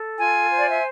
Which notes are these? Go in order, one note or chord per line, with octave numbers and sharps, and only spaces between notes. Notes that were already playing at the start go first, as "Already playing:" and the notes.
Already playing: A4
F4 G#5
C5
D5
E5